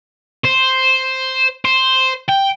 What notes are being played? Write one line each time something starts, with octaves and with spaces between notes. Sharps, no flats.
C5
C5
G5